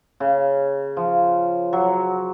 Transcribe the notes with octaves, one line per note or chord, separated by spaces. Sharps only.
C#3
F3
F#3